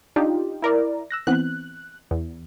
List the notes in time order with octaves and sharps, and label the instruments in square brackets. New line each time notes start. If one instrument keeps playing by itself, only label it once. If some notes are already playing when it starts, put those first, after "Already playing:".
[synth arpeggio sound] D4 [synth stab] D#4 F4 G4
[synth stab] E4 A#4 D5
[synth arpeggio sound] E6 F#6 A#6
[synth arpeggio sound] E3 B3 C4 [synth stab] F#6
[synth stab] E2